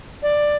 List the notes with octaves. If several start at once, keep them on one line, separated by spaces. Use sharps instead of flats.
D5